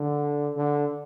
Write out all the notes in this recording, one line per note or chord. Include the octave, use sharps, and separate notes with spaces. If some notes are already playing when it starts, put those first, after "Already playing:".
Already playing: D3
D3